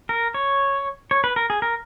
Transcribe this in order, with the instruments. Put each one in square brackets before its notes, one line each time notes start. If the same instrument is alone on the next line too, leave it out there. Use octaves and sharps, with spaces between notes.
[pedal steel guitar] A#4
C#5
C#5
B4
A#4
G#4
A#4